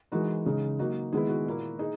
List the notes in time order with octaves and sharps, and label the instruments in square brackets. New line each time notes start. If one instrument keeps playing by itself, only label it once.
[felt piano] E3 G#3 D#4 F#4 A#4
C#3 G#3 D#4
F#3 A#3 D#4 F#4
F#4
D#3 G#3 B3 E4 G#4
F#4
A#2 A#3 E4
D#4 G#4